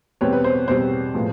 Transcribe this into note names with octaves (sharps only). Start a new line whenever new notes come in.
E2 B2 G3 C4 B4 C#5
B4
C5
E2 B2 G3 C4 C5
A2 F3 G#3 B3